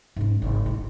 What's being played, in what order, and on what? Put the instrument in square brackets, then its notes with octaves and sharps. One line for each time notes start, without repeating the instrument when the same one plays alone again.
[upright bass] G#2 C#4
G#1 C#3
A1 D3